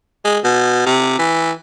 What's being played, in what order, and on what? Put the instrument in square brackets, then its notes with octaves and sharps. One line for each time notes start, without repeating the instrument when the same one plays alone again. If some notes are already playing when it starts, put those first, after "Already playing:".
[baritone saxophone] G#3
B2
C3
E3